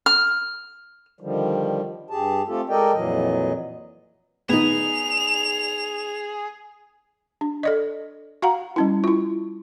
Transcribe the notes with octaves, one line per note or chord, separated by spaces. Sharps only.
F6
D3 D#3 F3 G3
G2 G4 G#4 A5
A3 C4 F4 G4 A4
G#3 A4 A#4 D5 D#5 G5
F2 A#2 E3 F#3 D#5
B3 D#4 G#4 F7
D4
A4 D5 D#5
F#4 F5 F#5 A#5
G3 C#4 E4
E4 F4